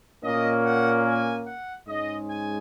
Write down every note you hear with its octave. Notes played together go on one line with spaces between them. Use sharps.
A#2 A#3 C#4 D#5
F#5
G#5
F#5
G#2 G#3 C#4 D#5
G#5